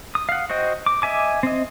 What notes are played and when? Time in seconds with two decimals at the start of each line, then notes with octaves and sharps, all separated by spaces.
0.15 D#6
0.29 F5 F#5
0.50 F#4 C5 D#5 G5
0.86 D6
1.02 D#5 E5 G#5 D6
1.43 C4 D#5